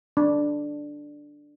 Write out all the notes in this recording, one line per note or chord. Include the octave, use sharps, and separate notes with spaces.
D4